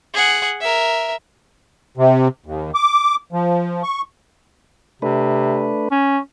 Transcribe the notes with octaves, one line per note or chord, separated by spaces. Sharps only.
G#4 F#5
A#4 E5
C3
D#2
D6
F3
C#6
C3 A3 D4 B4
C#4